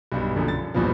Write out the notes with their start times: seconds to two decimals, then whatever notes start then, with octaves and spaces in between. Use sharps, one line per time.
0.12 B1 G2
0.36 A#1 F#2 D3
0.48 A6
0.74 A#1 E2 G2 B2 F3